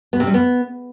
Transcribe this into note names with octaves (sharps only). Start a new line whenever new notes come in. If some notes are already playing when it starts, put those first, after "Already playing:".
B3
C3
G3
B3